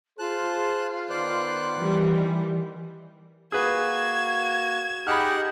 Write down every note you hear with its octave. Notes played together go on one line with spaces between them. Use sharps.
F4 G#4 C5 A5 F#6
D#3 B3 C5 D5 F#6
E3 G3
A#3 F#4 G#4 B4 G#6 E7
D#4 G4 G#4 F#5 B5 F6 F#6